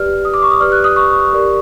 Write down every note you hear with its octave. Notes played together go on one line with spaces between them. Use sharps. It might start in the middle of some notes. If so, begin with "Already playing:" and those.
Already playing: G4 B4 D5 F6
D#6
D6
C#6
D#6
G4 B4 D5 F6
F#6
D#6
C#6
G4 A#4 D5